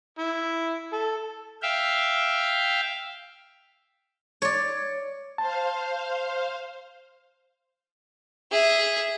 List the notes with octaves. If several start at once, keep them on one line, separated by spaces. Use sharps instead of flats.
E4
A4
E5 F5 G5
C#5 D5
C5 F5 A5
G#4 E5